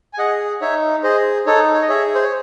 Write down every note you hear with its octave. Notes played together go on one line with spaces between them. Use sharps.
G#5
G#4 D#5 F#5
D#4 C#5 E5
G#4 C5 D#5
D#4 A4 C#5
C#5
D#5
G#4 C#5 E5
C5
C#5